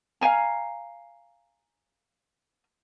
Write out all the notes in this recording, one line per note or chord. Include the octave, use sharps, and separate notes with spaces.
F5 G5 G#5 A#5